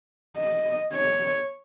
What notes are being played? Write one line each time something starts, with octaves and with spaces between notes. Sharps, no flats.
D#5
C#5